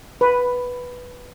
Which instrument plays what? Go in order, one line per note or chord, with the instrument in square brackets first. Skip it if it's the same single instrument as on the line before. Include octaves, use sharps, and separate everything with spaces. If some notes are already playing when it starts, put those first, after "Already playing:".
[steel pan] B4